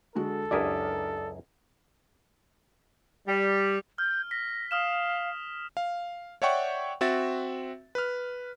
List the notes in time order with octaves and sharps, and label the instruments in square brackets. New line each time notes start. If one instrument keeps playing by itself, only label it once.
[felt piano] D3 G#3 F#4 [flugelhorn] A4
[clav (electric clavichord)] C#2 F#2 E4 [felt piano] D4 G4 A#4 [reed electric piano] D5 D#6
[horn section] G3
[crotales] F6 [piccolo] G6
[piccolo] A#6 [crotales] B6
[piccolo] F5 [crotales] D#6 F6 E7
[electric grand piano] F5
C#5 D5 E5 F#5 G5 C#6
C4 F#4 E5 A6
B4 F6